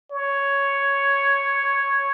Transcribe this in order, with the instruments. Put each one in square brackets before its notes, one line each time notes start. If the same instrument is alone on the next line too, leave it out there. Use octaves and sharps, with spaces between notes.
[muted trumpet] C#5